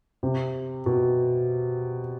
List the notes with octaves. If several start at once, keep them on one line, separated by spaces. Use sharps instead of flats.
C3
B2